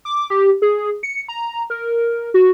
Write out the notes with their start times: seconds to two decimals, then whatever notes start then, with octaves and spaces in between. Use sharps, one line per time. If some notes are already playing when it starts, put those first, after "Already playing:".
0.05 D6
0.30 G4
0.62 G#4
1.03 C#7
1.28 A#5
1.70 A#4
2.34 F#4